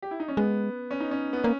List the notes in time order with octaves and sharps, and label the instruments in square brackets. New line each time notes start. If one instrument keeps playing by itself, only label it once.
[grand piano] G4
E4
D#4
C#4
[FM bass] G#3 [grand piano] B3
[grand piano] C#4
D#4
C#4
B3
[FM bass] A#3 [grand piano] C#4